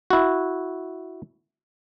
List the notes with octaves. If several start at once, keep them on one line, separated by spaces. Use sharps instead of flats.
E4 F#4